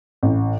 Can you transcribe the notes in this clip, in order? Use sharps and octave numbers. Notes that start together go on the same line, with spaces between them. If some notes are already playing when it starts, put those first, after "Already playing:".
A1